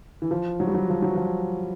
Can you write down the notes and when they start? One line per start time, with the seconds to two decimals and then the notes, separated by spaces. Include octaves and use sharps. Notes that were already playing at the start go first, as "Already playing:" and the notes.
0.22 E3
0.31 F3
0.60 F#3
0.67 G3
0.74 F#3
0.90 F3
1.02 F#3
1.16 F3